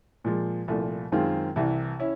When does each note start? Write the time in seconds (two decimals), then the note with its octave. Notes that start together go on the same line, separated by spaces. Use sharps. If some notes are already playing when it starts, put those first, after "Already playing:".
0.24 A#2 F3 G#3
0.68 C2 A#2 F3 A3
1.12 F#2 D#3 G#3 C4 F4
1.56 C2 C3 E3
1.99 C#4 E4